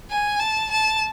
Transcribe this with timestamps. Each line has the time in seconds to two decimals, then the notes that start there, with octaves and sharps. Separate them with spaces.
0.10 G#5
0.40 A5
0.71 A5